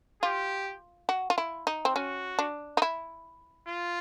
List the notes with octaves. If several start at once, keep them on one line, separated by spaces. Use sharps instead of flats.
F4 G4
F#4
F4
E4
D#4
C4
C#4 F#4
D4
D#4
E4
F4